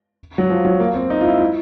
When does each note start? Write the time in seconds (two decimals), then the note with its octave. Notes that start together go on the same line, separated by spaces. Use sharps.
0.38 F#3
0.50 F3
0.65 F#3
0.80 A#3
0.94 C4
1.10 D#4
1.21 F4
1.25 E4
1.40 E4